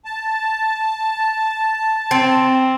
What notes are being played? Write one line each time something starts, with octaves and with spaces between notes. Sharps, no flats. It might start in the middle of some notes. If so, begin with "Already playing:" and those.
A5
C4